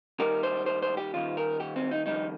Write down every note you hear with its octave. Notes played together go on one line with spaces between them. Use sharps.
D#2 D#3 G3 A#4
C5
C5
C5
G4
D#2 D#3 G3 F4
A#4
G4
C4
D#4
F2 D#3 G3 D#4